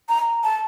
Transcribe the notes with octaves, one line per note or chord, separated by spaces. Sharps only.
A#5
A5